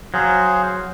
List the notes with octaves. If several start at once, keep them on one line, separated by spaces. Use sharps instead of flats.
F#3 G#4 C5 F5